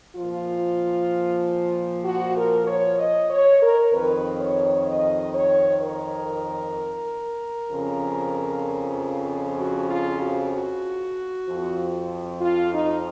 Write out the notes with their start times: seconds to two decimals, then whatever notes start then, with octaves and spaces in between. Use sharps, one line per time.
0.16 A#2 F3 F4
2.05 F#4
2.37 A#4
2.67 C#5
2.99 D#5
3.30 C#5
3.62 A#4
3.93 F2 D#3 B4
4.40 C#5
4.88 D#5
5.34 C#5
5.82 A#4
7.70 F2 C#3 F3
9.60 F#4
9.90 F4
10.22 F#4
10.53 F#4
11.48 F2 F3
12.41 F4
12.74 D#4